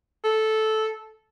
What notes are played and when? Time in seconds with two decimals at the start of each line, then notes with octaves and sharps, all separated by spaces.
0.25 A4